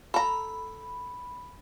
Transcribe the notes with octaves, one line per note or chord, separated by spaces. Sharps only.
A4 A#5 B5